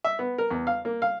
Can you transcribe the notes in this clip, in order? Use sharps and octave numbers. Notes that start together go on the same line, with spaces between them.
E5
B3
A#4
E2
F5
A#3
F5